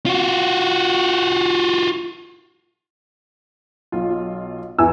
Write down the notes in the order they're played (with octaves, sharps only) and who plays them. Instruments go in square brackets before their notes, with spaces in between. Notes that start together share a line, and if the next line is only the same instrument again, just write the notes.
[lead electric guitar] F4 F#4
[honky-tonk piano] B1 F4
[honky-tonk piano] E2 [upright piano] E3 G#5 E6